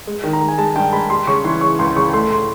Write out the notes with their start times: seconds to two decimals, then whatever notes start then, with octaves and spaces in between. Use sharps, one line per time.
0.07 G#3
0.24 D#3
0.33 A#5
0.41 G#3
0.48 G#5
0.58 G#3 A5
0.75 G2 G5
0.93 G#3 B5
1.10 G3 C6
1.27 C#3 C#6
1.45 E3 C6
1.61 C#3 C#6
1.79 C#2 C6
1.96 C#3 C#6
2.13 A3 C6
2.30 A2 C6